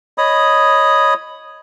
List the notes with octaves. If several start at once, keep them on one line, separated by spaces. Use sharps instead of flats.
C#5 D#5 B5 D#6